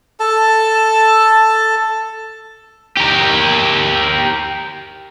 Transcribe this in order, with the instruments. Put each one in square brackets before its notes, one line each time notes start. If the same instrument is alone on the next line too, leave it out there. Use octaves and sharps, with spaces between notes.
[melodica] A4 A5
[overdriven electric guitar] G4 A#4